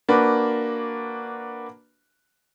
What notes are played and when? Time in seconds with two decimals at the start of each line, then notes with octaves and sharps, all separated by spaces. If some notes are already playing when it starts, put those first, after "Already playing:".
0.09 A#3 D4 F#4 B4